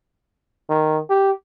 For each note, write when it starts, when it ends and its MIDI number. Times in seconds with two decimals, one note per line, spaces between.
0.69 0.99 51
1.10 1.31 67